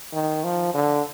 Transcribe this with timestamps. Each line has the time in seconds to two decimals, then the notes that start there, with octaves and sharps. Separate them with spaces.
0.13 D#3
0.44 F3
0.74 D3